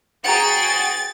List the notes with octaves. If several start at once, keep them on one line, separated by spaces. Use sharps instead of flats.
F#4 G#4 F#5 G5 A#5 A6